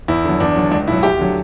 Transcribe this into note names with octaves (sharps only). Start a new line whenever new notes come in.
E2 E4
D3 F#3
E2 D4
D3 F#3
C#2 D4
B2 F#3 E4
D2 G4
D3 F#3